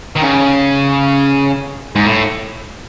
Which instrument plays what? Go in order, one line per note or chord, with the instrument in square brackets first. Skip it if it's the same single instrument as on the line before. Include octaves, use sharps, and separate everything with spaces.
[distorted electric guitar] D#3
C#3
G#2
A2